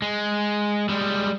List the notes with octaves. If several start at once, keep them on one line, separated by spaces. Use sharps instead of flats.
G#3
G3 G#3